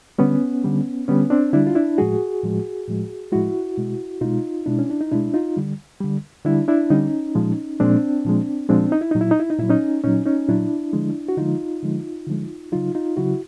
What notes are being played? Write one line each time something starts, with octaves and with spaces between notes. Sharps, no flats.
D3 G3 B3 C#4
D3 G3
D3 G3 B3 C#4
C4 D4
D3 G3 D4 E4
F4
D4 E4
A2 F3 G#3 F#4 G#4
A2 F3 G#3
A2 F3 G#3
A2 F3 G#3 E4 F#4
B2 G#3
B2 G#3 D#4 F4
B2 G#3 D4 E4
C#4
D4
D#4
B2 G#3 D4 E4
D#4 F4
D3 G3
D3 G3
D3 G3 D4 E4
D4 E4
D3 G3 C#4 D#4
A#2 F3 G#3
A#2 F3 G#3 C4 D4
A#2 F3 G#3
A#2 F3 G#3 C4 D4
D#4
E4
A#2 F#3 D#4
E4
D#4
E4
D#4
A#2 F#3 E4
C#4 D#4
A#2 F#3 C#4 D#4
C#4 D#4
A#2 F#3 D4 E4
D3 F3 G#3
F#4
D3 F3 G#3 D#4 F4
D3 F3 G#3
D3 F3 G#3
C#3 F#3 D#4 F4
D#4 F4
C#3 F#3 E4 F#4